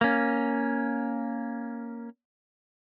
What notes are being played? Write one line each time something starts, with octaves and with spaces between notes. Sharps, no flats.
A#3 C#4